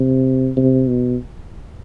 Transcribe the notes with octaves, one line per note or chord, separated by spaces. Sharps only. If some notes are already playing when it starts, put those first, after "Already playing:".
Already playing: C3
C3
B2